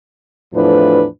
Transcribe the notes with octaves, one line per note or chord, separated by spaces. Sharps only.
E2 A2 F3 D4 B4